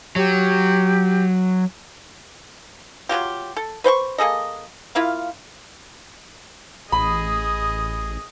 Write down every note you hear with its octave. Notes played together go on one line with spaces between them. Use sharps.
F#3 G4
F#3 G#3 F4 G4
A4
B4 C5 F#5 C#6
A#3 G#4 A4 D#5
A#3 E4 F4 F5
A1 G#4 D#5 B5